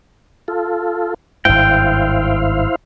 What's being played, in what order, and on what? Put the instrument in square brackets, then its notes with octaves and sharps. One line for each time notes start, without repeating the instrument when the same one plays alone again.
[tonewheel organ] F4 A4
[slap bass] G#1 G2 [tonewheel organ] E4 C5 F5 [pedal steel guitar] G5